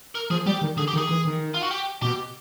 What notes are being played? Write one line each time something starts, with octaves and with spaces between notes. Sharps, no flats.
A#4
F3 G#4
G3 G4
D#3
D3 G#4
G4
D#3
G#4
E3
D#3
F4
F#4
G4
B2 G4